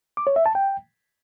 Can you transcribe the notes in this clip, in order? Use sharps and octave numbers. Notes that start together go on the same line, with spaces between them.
D6
C#5
E5
A5
G5